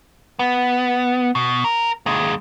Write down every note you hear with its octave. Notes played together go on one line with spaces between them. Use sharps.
B3
B2
A#4
D#2 G#3